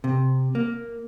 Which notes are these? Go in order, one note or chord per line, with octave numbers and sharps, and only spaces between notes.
C3
A#3